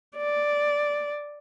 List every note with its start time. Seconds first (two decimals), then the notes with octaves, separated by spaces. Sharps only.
0.17 D5